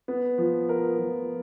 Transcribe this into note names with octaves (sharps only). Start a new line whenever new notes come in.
B3
F3
A#4
F3